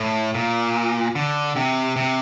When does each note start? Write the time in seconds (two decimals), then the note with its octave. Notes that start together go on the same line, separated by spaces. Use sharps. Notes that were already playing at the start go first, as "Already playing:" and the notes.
Already playing: A2
0.35 A#2
1.15 D3
1.56 C3
1.96 C3